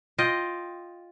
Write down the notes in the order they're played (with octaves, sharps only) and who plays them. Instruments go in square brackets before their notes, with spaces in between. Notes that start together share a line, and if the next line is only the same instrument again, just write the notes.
[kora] F4 D#5 G5